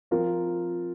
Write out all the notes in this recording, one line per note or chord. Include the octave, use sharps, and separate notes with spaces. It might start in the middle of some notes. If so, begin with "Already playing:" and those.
F3 C4 F4 A#4